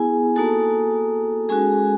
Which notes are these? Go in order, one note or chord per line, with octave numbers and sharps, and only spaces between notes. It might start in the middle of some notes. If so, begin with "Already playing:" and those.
Already playing: B3 E4 G#4 G#5
A#3 D#4 F#4 A4 A5
G#3 C#4 F#4 G#4 G#5